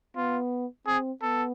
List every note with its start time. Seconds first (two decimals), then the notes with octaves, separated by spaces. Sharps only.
0.16 B3 F4
0.87 C4 G#4
1.22 B3 A4